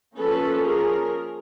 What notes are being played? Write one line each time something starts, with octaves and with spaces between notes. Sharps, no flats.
F3 A#3 C#4 A4 B4
G#4 A#4